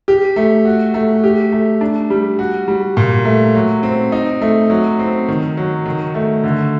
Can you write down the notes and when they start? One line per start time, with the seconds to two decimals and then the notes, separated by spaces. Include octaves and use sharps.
0.08 G4
0.36 A3
0.65 F#4
0.94 A3
1.24 G4
1.52 A3
1.81 D4
2.10 G3
2.39 F#4
2.68 G3
2.97 A#2
3.25 A3
3.55 F#3
3.83 C4
4.12 D#4
4.42 A3
4.70 F#3
4.99 C4
5.28 D#3
5.57 F#3
5.86 D#3
6.15 A3
6.44 D3